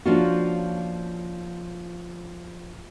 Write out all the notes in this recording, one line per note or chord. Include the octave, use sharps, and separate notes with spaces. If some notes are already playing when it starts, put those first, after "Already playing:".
F3 A#3 C#4 D4 F4 F#4